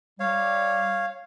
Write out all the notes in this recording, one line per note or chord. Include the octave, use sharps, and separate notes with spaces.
G3 C#5 F5